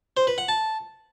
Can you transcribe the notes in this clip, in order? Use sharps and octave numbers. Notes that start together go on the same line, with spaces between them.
C5
B4
F#5
A5